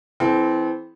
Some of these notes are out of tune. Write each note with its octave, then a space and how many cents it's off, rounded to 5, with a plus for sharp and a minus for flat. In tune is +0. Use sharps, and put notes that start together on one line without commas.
E3 +0 C4 -10 A4 -40